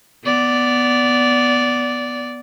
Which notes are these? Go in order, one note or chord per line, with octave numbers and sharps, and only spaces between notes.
B3 D5